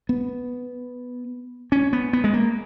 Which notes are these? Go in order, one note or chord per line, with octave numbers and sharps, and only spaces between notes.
B3
C#4
B3
B3
G#3
A#3